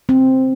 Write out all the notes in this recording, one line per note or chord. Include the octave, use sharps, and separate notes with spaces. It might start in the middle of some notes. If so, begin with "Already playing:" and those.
C4